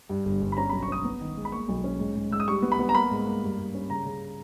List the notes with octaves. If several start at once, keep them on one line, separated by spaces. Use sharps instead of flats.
G2
G1
G1
B5
C#4 A#5
B1 B5
C#6
C#4 D#6
B3
D#3
G#3
B5
A#3 C#6
B1
C#4
G#2
G#2
G#2 E6
D#6
G3 C#6
B3
B5
B3
A#5
A#3 B5
G#2
A#3
G2
G2
C#4
C#3 A#5
C#3